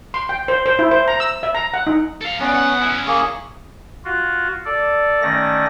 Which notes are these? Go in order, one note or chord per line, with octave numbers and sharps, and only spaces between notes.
C6
G5
C5
C5
E4
C5
A#5
E6
E5
A#5
F#5
D#4
A4 F5
C#2 B3 C#4 D5
F2 F#5
C#4 E4 G#5
A#3 G#4 C#6
F4 F#4
A4 D5
D#3 A3 C#4 D5 A#6